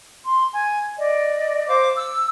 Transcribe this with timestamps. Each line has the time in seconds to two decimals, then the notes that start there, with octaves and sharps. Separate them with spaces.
0.24 C6
0.53 G#5
0.98 D5 D#5
1.68 C5 F5 D6
1.96 E6